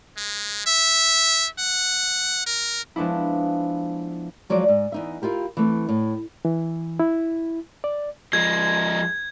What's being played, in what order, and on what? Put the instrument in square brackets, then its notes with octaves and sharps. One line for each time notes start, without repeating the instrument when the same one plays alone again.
[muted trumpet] G#3
E5
F#5
A#4
[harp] F3 G#3 B3 D4 E4
[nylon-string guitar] F3 F#3 G#3 C5 D5
G#2
E2 D#4 E5
E4 F4 G4 A#4
E3 A3 C4
A2
[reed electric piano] E3
E4
D5
[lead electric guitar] F3 G#3 [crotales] G#6